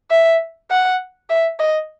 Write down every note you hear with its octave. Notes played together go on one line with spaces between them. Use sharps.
E5
F#5
E5
D#5